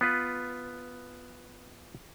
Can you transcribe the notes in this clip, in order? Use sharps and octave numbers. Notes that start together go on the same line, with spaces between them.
B3 F4 B4